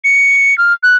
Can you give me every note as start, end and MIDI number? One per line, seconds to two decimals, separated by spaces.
0.04 0.57 97
0.58 0.73 89
0.83 0.97 90